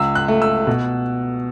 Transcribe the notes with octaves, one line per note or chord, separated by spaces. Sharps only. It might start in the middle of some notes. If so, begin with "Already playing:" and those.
Already playing: C#2 E6
F#6
A3
E6
B2